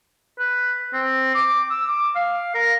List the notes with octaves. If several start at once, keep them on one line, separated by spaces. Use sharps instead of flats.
B4
C4
D6
E6
D6
F5
A#4